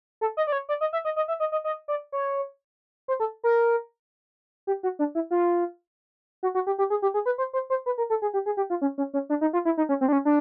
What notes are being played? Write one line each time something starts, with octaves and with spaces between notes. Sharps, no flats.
A4
D#5
D5
C#5
D5
D#5
E5
D#5
D#5
E5
D#5
D#5
D#5
D5
C#5
C5
A4
A#4
G4
F#4
D4
E4
F4
F#4
F#4
G4
G4
G#4
G4
G#4
B4
C5
C5
C5
B4
A#4
A4
G#4
G4
G#4
G4
F4
C#4
C#4
C#4
D4
D#4
F4
E4
D#4
C#4
C4
D4
C#4
D4